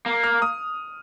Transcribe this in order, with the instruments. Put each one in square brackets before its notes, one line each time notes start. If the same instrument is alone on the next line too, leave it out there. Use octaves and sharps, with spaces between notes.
[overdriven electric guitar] A#3
[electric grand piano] F6
D#6